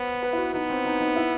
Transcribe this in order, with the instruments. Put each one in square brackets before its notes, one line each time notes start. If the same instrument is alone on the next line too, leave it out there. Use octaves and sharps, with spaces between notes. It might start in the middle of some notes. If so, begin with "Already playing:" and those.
Already playing: [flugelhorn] B3 [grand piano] C5
[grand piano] B4
E4
F#4
[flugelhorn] B3 [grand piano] D#4
[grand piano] C4
D#4
D#4
E4